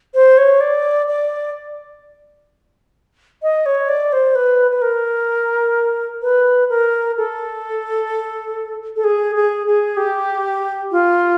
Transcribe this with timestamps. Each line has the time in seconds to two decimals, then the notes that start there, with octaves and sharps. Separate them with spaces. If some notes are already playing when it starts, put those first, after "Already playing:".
0.14 C5
0.38 C#5
0.61 D5
1.08 D5
3.42 D#5
3.66 C#5
3.89 D5
4.12 C5
4.35 B4
4.71 B4
4.82 A#4
6.22 B4
6.70 A#4
7.17 A4
8.96 A4
9.04 G#4
9.36 G#4
9.67 G#4
9.97 G4
10.91 F4